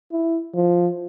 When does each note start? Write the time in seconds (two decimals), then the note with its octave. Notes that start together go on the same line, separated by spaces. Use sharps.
0.12 E4
0.54 F3